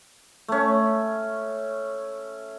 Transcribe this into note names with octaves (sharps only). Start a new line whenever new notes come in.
A3 C#4